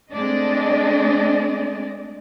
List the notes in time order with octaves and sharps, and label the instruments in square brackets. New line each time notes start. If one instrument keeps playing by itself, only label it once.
[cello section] G#3 A3 C4 D4 D5 D#5